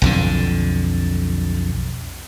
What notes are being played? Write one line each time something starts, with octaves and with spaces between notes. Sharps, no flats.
B1 F2 D3